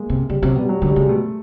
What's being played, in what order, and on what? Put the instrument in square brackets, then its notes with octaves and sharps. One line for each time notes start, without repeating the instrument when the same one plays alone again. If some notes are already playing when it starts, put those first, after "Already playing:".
Already playing: [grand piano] G#3 A#3
[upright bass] C3
[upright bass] C#3 [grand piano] G3
[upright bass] C3 [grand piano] F#3
[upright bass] B2 [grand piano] G3
[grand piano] F#3
[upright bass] D3 [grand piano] F#3
[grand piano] G3
[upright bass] C#3 [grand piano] G#3
[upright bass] B2 [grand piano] A3